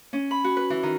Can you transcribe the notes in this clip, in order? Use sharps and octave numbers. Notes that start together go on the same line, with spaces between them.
C#4
B5
F#4
B4
E3
D#3